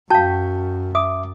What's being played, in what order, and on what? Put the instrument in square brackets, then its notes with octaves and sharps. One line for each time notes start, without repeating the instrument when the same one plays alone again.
[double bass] F#2 [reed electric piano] F#4 G5 G6 [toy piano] F5 A5
[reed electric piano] E5 D6 [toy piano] D#6